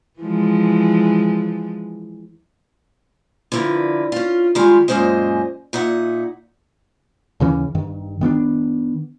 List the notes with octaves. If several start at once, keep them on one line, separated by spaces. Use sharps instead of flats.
E3 F3 G#3
D3 F3 E4 A#4 B4
C#4 F4
D#3 G3 G#3 F4 G4 G#5
F#2 A#2 G#3 C#4 C5 D#5
A#2 D#4 E5 F#5
D#2 C#3 E3 C#4
G2 D#3
D#3 B3 C#4 D4